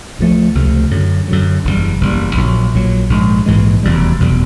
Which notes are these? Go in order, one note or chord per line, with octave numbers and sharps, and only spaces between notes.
C#2 C3 F3 A3
C#2 C3 F3 A3
F#2 D3 F#3
F#2 D3 F#3
F#1 E2 B2 G3
F#1 E2 B2 G3
A#1 A#2 F#3
A#1 A#2 F#3
A#1 G#2 E3 G#3
A#1 G#2 E3 G#3
F1 E2 B2 G3
F1 E2 B2 G3